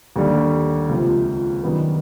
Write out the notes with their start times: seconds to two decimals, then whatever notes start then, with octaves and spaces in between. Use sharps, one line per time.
0.16 D#2 D3 G3
0.89 C#2 C3 F3
1.63 F#2 D#3 G3 B3